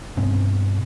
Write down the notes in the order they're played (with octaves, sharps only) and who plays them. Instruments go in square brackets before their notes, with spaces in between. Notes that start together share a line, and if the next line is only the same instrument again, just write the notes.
[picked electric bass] G2 B2 C4 C#4